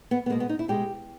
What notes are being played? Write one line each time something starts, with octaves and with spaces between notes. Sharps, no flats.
B3
B3
B2 G#3 A#3
B3
D#4
E4
B2 G#3 G4